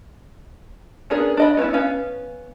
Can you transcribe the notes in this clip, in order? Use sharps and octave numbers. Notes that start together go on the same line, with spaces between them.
B3 C#4 D4 G#4 A#4
D4 D#5 B5
B3 C#4 D#4 E4
B3 C#4 F5